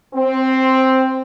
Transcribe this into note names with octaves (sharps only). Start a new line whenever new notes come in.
C4